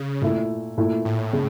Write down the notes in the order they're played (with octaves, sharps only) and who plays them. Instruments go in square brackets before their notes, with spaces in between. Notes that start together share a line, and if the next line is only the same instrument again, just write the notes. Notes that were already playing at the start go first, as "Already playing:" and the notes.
Already playing: [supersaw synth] C#3
[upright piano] A#2 A3 E4
A#2 A3 E4
[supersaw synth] A2
[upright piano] C#3